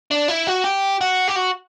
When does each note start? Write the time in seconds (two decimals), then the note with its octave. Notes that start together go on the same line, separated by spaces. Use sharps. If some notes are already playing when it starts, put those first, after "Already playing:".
0.11 D4
0.29 E4
0.47 F#4
0.64 G4
1.01 F#4
1.28 G4
1.36 F#4